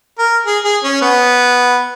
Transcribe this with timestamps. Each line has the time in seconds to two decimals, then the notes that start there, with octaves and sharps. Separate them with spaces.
0.19 A#4
0.46 G#4
0.65 G#4
0.84 C#4
1.02 B3